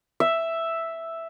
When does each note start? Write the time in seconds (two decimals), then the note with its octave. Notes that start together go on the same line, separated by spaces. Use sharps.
0.20 E5